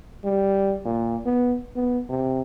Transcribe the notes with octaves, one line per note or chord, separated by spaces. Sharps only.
G3
A#2
B3
B3
C3